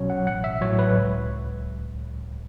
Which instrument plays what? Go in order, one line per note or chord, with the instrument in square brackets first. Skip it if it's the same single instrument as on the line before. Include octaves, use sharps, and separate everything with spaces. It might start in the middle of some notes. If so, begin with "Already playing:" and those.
Already playing: [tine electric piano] B1 B2 F#3 C#4 C#5
F#5
A1 F#5
E5
A2 F#3 C#5
B4
C#2